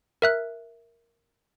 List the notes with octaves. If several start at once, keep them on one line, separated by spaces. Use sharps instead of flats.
A#4 E5 F#6